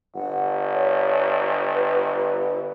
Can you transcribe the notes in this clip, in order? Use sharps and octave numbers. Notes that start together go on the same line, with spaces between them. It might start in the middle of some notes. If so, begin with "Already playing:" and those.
G1 F#5
C#5
B4